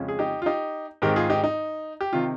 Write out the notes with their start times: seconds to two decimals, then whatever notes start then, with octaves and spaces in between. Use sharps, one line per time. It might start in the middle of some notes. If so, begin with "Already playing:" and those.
Already playing: F2 C#3 G#3 C#4
0.08 G#4
0.19 D#4 G4
0.42 F4
0.46 D#4 G4
1.02 G#2 D#3 G#3 C4 G4 A#4
1.16 F4 G#4
1.30 D#4 G4
1.44 D#4
2.01 G4
2.13 C3 D#3 F4